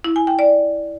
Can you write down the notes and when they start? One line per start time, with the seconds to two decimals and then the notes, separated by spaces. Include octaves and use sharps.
0.04 E4
0.16 G#5
0.27 G5
0.39 D5